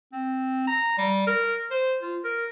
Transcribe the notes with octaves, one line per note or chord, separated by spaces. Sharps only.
C4
A#5
G3
A#4
C5
F4
A#4